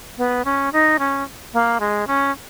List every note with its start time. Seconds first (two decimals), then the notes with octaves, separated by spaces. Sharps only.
0.18 B3
0.45 C#4
0.73 D#4
0.99 C#4
1.53 A#3
1.80 G#3
2.07 C#4